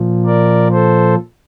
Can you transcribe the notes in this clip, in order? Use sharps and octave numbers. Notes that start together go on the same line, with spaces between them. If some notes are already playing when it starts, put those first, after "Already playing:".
Already playing: A#2 F3
A#4 D5
A4 C5